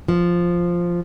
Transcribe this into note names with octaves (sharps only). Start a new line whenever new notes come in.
F3